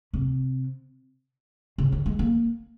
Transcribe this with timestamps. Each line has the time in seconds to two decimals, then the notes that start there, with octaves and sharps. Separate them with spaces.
0.13 C3
1.78 C#3
1.92 D#3
2.06 G#3
2.19 A#3